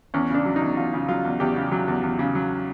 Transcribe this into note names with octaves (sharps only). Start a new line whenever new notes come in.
E2 C#4
C#3 D4
F#3
D#4
E2
E2 F4
C#3
F#3 F4
E2
E2 G4
C#3
F#3
E2
E2
C#3
F#3